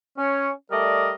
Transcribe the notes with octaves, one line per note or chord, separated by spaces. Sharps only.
C#4 C#5
G3 A3 A#4 D5 D#5